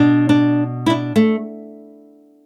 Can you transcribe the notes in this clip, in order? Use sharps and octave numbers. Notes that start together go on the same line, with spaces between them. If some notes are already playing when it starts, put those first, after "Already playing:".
Already playing: B2 D4
D4
E4
D4
A3